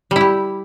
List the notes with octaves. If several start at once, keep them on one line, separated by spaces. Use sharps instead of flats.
G3 E4 G4